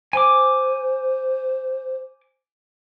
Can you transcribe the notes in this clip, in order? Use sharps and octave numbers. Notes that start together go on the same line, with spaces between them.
C5 G#5 D6